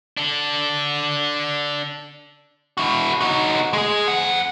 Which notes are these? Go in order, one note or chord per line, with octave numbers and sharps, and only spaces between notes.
D4 A4
E4 F#4
D#4 F#4
G#3 G#4
F2 F#5